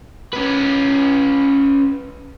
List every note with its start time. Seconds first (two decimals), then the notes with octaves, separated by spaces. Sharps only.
0.33 C#4 B4